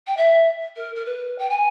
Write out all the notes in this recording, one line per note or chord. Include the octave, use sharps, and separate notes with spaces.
G5
E5
A#4
A#4
B4
G5
G#5